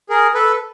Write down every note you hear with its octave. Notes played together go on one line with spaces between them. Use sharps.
G#4 A#4
A4 B4